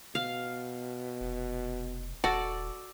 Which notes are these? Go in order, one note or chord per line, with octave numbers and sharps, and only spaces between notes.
B2 F5
F1
D#1 F#4 A4 D5